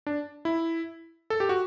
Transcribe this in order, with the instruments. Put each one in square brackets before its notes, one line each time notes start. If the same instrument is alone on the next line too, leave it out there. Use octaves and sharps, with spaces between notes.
[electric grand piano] D4
E4
A4
G4
F#4